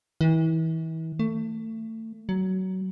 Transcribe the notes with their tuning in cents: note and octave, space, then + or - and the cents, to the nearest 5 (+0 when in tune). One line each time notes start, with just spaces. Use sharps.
E3 -35
A3 +25
F#3 +20